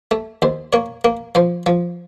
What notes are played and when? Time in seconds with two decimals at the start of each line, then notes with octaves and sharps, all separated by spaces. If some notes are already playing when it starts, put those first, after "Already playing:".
0.11 A3
0.42 D#2 C5
0.73 A#3 C#5
1.05 A#3
1.35 F3 C5
1.66 F3